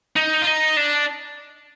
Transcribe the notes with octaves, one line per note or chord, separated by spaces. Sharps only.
D#4
F4
D#4
D4